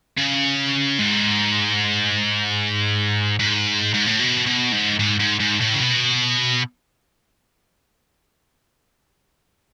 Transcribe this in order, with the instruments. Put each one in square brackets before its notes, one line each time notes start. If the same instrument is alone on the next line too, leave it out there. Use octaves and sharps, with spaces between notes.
[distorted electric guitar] C#3
G#2
G#2
G#2
A2
B2
B2
G#2
G#2
G#2
G#2
A2
C#3
B2